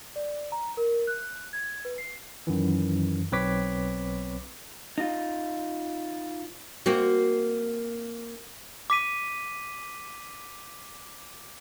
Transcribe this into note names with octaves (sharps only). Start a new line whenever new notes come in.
D5
A#5
A#4
F#6
G#6
B4
C7
F#2 D#3 E3
B1 C4 B4 C#5 D6 B6
D#4 F4
A#3 C4 F#4
D6 B6 D#7